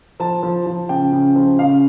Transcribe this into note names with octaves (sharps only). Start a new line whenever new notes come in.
F3 A5
F3
F3
C#3 G5
C#3
F3
C#3 F5